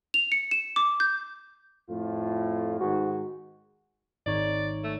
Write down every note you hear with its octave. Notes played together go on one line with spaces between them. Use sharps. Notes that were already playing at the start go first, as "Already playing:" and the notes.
F7
C#7
E7
D6
G6
F2 A2 A3 F4
G#2 D#3 F#4
G#1 D#4 C#5 D5
A3